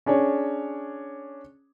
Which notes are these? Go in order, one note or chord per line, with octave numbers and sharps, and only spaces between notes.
C#4 D4 G#4 C#5